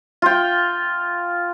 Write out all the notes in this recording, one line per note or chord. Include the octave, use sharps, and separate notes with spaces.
F4 G5